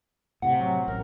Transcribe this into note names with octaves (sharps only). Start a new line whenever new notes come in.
A2 C3 F#5
F#3
A1 A#4